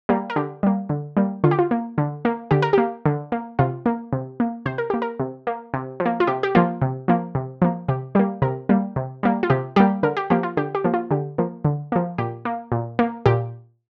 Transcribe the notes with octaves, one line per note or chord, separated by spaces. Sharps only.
G3 A#3
A#4
D3 G4
G3 A#3
D3
G3 A#3
D3 F4
G4
F4
A#3
D3
A#3
D3 G4
A#4
A#3 G4
D3
A#3
C3 F4
A#3
C3
A#3
C3 C5
A#4
A#3 G4
A#4
C3
A#3
C3
F3
A#3
F4
C3 G4
G4
F3 A#3 F4
C3
F3 A#3
C3
F3 A#3
C3 G4
G3 A#3 G4
C3 A#4
G3 A#3
C3
G3 A#3
F4
C3 G4
G3 A#3 G4
D3 A#4
G4
F3 A#3 G4
F4
D3 G4
G4
F3 A#3
F4
D3 G4
F3 A#3
D3
F3 A#3
A#2 G4
A#3
A#2
A#3
A#2 G4